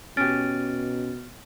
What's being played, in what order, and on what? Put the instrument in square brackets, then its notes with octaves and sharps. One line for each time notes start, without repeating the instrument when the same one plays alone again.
[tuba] B2 [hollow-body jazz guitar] C#4 G4 [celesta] F6 A6 D7